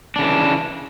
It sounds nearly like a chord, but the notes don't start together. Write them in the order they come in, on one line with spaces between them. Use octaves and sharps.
D4 C#3 E3